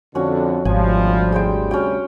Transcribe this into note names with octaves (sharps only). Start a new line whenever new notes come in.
F2 D3 C#4 D4 F#4
G#1 D2 C3 F3 G3 G#5
G#3 C5 G5
C#4 F#4 G5